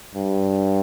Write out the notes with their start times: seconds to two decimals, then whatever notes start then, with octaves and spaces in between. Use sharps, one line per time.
0.15 G2